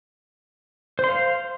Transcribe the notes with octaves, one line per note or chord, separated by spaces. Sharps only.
C5 F5 C6